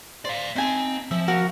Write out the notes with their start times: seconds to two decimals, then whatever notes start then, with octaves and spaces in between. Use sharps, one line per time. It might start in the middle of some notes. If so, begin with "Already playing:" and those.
0.25 C5 D5 F5
0.56 C4 D#4 G#5 A5
1.11 F3 E5
1.28 F#4 A#4 F5